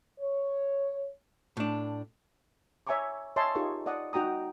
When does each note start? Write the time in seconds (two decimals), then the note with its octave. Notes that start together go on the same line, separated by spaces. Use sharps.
0.20 C#5
1.57 A2 D4
2.87 C#5 E5 G#5 A#5 C#6 D6
3.36 C#5 D#5 E5 G#5 A5 C6
3.55 D#4 F4 G4 G#4 A#4 C#6
3.86 D5 D#5 F#5 D#6
4.13 D#4 F#4 G5 A#5 D#6